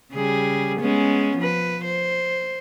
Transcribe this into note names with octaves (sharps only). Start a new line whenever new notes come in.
C#3 G3 G#4
G#3 B3 C#4
F3 B4
C5